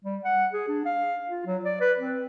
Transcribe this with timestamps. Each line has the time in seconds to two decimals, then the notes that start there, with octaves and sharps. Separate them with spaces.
0.05 G3
0.24 F#5
0.53 G#4
0.68 D4
0.86 F5
1.30 F4
1.46 F#3
1.65 D5
1.81 B4
1.99 C4